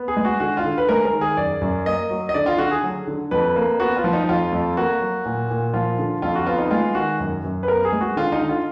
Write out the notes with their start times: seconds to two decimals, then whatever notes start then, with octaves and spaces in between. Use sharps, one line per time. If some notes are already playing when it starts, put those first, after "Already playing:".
Already playing: B3
0.08 G#4
0.17 G#3
0.25 F#4
0.40 D3 F#4
0.57 F4
0.64 D3
0.78 B4
0.89 G#3 A#4
1.05 A#4
1.13 D#3
1.21 G#4
1.37 F#2 D5
1.61 F#2
1.86 A#3 D#5
2.10 F#3
2.29 D#5
2.34 D3 D5
2.46 F4
2.58 D3 F#4
2.71 G#4
2.84 F#3
3.07 D3
3.31 F2 B4
3.56 A#3
3.80 B3 F#4
3.96 F4
4.04 F3
4.13 D#4
4.29 F2 F4
4.53 F2
4.77 A#3 F#4
5.01 F#3
5.26 A#2
5.50 A#2
5.74 F3 F4
5.99 D3
6.22 F2 F4
6.35 F#4
6.46 B3 F4
6.58 D#4
6.71 G#3 F4
6.95 D#3 F#4
7.20 F#2
7.44 F#2
7.63 B4
7.68 B3 A#4
7.85 G#4
7.93 G#3
8.01 F#4
8.16 D3 F4
8.32 D#4
8.41 D3
8.49 F4